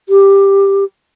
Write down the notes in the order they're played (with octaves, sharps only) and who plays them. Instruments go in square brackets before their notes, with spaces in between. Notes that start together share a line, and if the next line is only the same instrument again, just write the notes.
[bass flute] G4